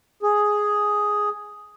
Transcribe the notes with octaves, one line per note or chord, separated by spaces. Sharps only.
G#4